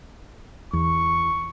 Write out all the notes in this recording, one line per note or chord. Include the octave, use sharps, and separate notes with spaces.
E2 C#6